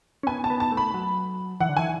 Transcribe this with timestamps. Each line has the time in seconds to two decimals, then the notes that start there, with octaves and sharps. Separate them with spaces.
0.23 C#4
0.27 B3 G#5
0.44 A5
0.50 B3
0.60 A5
0.72 A3
0.77 B5
0.94 F#3
1.60 E3 F#5
1.69 D3
1.77 E3 G#5